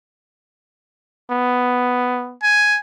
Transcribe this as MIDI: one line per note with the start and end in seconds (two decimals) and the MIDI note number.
1.30 2.35 59
2.43 2.79 80